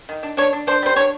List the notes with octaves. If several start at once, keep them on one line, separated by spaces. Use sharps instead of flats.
D#3
D4
D4 C#5
D4
D4 C5
G3 C5
D4 C#5